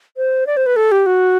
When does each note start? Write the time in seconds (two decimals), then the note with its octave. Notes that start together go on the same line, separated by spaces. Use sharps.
0.17 C5
0.47 D5
0.57 C5
0.66 B4
0.76 A4
0.92 G4
1.06 F#4